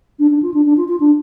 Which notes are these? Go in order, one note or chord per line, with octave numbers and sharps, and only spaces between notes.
D4
D4
F4
D4
D4
F4
F4
D4